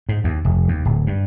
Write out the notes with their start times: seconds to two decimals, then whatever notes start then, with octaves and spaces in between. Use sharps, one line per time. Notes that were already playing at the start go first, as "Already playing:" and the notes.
0.09 G#2
0.24 D#2
0.45 F1
0.68 D#2
0.85 D1
1.07 G2